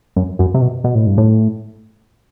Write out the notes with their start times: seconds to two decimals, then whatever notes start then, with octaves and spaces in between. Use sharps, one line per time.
0.16 F#2
0.39 F#2
0.54 C3
0.61 B2
0.84 B2
0.95 A2
1.07 G2
1.18 A2